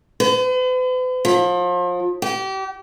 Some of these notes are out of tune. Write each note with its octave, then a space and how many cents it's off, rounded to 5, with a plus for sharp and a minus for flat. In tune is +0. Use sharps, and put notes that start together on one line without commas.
B4 +45
F3 +35
G4 -30